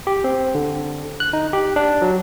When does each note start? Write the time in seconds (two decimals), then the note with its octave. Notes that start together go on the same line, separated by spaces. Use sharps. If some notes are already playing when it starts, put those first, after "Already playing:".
0.07 G4
0.24 C4
0.55 D3
1.20 F#6
1.33 D#4
1.53 G4
1.76 D4
2.02 F#3